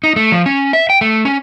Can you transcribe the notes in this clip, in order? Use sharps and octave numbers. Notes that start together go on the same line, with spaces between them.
D#4
A3
F3
C#4
E5
G5
A3
C#4